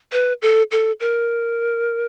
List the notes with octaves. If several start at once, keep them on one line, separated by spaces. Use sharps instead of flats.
B4
A4
A4
A#4